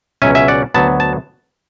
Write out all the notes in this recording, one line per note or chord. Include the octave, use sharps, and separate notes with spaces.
C#2 B2 F#3 C#4 E5 G#5
E5 G#5
D5 F#5
D2 D3 F#3 B3 A5
A5